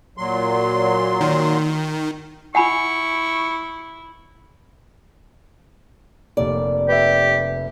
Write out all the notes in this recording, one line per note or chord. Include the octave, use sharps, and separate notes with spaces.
A#2 F#3 C6
D#3
E4 F#5 G#5 B5 C#6
F1 C3 A#3 D5
G4 B4 E5